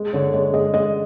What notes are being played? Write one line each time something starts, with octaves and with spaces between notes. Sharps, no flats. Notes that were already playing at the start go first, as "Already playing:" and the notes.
Already playing: G#3
D3 C#5
G#3 C#5
G#3 D#5
G#3 D#5